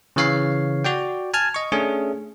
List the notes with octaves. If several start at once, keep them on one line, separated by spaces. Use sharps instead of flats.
C#3 E3 C#5 F5 C7
F#4 D5 G5
G#5 A5 F6 G#6
D#5 C#6
A3 C#4 D4 G#4